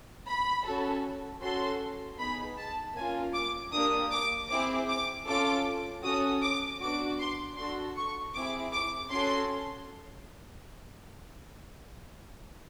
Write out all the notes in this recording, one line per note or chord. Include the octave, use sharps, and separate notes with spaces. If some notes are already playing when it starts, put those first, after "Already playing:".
B5
C#4 F#4 A4
C#4 F#4 A4 C6
B3 D#4 G#4 B5
A5
A#3 C#4 F4 G#5
D6
A#3 D4 G4 D#6
D6
C4 E4 G#4 D6
D6
C#4 F4 A4 D6
C#4 F#4 A4 D#6
D6
B3 D4 F#4 D6
C6
D4 F#4 A4 C6
C#6
C4 E4 G#4 D6
D6
C#4 F#4 A4 C6